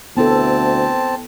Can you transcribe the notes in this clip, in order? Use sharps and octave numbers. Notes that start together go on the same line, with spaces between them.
D2 B3 C4 E4 A4 A5